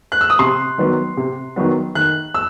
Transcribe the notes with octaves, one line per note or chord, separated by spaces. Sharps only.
F#6
E6
D#6
C3 C6
D#3 F#3 B3
C3
D#3 F#3 B3
D#3 F#6
E6